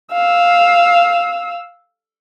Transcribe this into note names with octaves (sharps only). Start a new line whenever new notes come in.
F5 E6